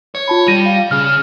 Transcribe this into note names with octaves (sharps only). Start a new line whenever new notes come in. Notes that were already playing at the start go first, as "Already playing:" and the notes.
C#5
F4 A5 B5
G3 A#6 D#7
F5
C#3 F6